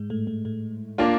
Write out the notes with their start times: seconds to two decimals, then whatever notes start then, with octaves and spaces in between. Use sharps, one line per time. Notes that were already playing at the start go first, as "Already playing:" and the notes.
Already playing: G#2 G#3
0.10 A2 A3
0.27 A2 A3
0.45 A2 A3
0.98 A#3 D4 F4